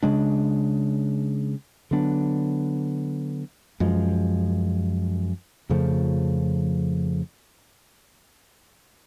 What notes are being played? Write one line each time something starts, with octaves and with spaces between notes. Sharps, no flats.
C#3 G#3 D4
D3 F#3 B3 D4
F#2 F3 G#3
F2 C#3 F3 A3